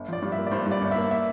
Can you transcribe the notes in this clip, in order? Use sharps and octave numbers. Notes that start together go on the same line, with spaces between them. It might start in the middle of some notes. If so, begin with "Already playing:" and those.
Already playing: G1
F3 D5
G2
A#3 E5
D5
G2 C5
G2
D5
G1
A#3 E5
E5